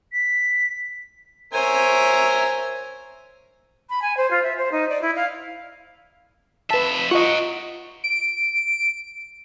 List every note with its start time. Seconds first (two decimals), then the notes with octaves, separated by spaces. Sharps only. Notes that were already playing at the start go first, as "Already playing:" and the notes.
0.13 B6
1.54 A#4 C5 C#5 E5 G#5
3.89 B5
4.01 G#5
4.17 C5
4.30 F4
4.43 E5
4.57 C5
4.71 D#4
4.88 D5
5.01 E4
5.15 F5
6.71 F2 B4 E5 A5
7.11 F4 A#4 D#5 F#5 C#6
8.04 D7